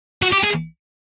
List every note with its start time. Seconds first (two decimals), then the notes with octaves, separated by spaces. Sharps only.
0.22 F#4
0.32 G4
0.43 G#4